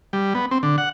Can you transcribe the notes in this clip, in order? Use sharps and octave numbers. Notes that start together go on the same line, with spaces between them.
G3
B3
C4
D3
F#5